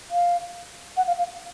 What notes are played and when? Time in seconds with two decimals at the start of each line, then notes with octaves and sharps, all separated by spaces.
0.10 F5
0.97 F#5
1.07 F5
1.18 F5